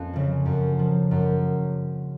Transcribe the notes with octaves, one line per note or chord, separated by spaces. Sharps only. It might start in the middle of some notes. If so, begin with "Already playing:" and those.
Already playing: F2 A#3 C#4
C#3 F3
F#2
F3
F#2